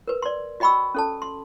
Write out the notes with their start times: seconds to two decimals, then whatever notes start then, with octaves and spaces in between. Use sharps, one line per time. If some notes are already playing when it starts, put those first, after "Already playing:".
0.08 A#4 B4
0.22 D5 C6
0.60 F#4 D#5 G5 B5 C#6 E6
0.94 C#4 A4 A5
1.22 C6